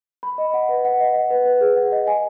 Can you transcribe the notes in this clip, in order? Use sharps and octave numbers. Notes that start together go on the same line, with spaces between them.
B5
D#5
F#5
B4
F#5
D#5
F#5
B4
B4
G#4
F#5
D#5
G#5